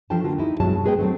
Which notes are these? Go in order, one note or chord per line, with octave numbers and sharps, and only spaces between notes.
E3 F3 D4 A4 G5 A5
D3 A#3 F4 F#4
D#4 E4 G4
G2 B2 F#3 G#3 A5
G#3 B3 G#4 B4 D#5 G5
F#3 A3 C4